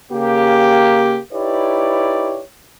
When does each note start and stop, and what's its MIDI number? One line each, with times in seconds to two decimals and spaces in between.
0.12 1.18 49
0.12 1.18 58
0.12 1.18 67
1.33 2.41 63
1.33 2.41 64
1.33 2.41 67
1.33 2.41 71
1.33 2.41 73
1.33 2.41 74